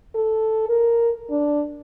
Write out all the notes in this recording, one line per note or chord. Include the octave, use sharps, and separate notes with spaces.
A4
A#4
D4